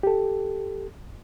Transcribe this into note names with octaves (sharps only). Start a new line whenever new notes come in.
G4 A4